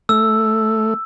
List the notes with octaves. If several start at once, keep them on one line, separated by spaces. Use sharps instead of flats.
A3 E6